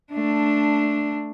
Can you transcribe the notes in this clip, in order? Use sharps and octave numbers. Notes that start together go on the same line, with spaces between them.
A3 D4